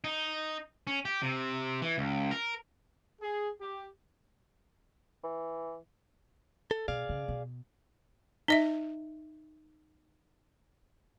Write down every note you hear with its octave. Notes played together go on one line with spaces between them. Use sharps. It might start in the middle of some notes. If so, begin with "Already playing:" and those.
D#4
C#4
G4
C3
E3
C#2
A#4
G#4
G4
E3
A4
B2 G#4 D5 F5
C#3
B2
D#4 D#5 E5